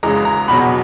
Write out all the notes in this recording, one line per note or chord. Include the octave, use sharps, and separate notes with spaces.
F#2 C#3 E3 G#3 A#5
A#5
E2 B2 F#3 B5